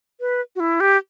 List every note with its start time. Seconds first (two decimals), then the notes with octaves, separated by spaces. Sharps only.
0.20 B4
0.56 F#4
0.60 E4
0.80 G4